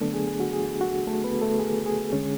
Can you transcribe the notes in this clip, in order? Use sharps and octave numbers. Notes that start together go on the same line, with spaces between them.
D3 F#3 A3 B3 D4 A4
G#4
G#4
F#4
G#4
F#4
A3 A4
B3 B4
A3 A4
G#4
G#4
D3 G#3 C#4